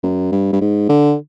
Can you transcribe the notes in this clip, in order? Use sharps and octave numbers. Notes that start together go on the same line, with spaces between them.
F#2
G2
G2
G#2
D3